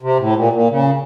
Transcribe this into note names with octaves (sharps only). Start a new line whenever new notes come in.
C3
A2
A#2
A#2
C#3